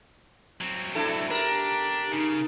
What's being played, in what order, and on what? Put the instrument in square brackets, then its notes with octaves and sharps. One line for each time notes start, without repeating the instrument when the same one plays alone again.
[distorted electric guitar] F#3 C4
[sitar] D4 E4 A4
[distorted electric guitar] D4 [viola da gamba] G4 [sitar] A#4
[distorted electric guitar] C#3 [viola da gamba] D#4